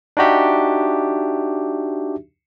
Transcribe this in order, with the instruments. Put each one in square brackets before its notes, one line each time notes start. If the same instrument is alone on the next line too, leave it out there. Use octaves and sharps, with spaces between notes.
[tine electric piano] D4 D#4 F#4 G4 E5